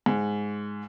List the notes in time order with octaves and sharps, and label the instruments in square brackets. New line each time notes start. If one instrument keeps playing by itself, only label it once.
[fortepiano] G#2